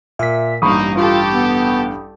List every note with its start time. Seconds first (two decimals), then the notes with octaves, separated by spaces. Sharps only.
0.19 A#2 E5 B6
0.62 A1 G2 A#3 D#4 B5 C#6 D#6
0.97 F4 G4 A4
1.33 B3